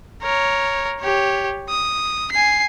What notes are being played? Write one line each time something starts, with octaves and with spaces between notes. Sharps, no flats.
A#4 C#5
G4 C#5
D#6
G#5 C7